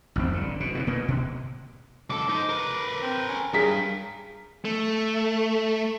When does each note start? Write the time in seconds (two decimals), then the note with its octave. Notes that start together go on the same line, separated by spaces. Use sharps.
0.16 A1 F2 C4
0.34 G1 D3
0.60 B2
0.75 C3 D#3 E3
0.87 B2 A#3 B3
1.08 B2
2.10 C#2 A4 D6
2.29 D#4 C5
2.49 A#4 B4
3.02 C4
3.29 C#4
3.54 G2 G#4 A#4 B6
4.65 A3